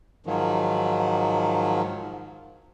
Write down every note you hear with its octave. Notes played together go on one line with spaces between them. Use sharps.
G#2 D#3 F3 F#3